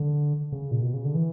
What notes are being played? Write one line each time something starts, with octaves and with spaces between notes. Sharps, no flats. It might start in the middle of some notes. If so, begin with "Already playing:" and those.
Already playing: D3
C#3
A#2
B2
C#3
D3
E3